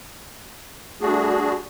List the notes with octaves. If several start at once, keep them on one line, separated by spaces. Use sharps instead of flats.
G3 A3 D4 F#4 G#4